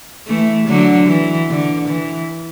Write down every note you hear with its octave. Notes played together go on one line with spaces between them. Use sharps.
E3 A3
D3 F#3
E3
D3
E3